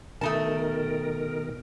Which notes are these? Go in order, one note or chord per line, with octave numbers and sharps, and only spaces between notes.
B2 D#3 A3 D#4 A#4 A5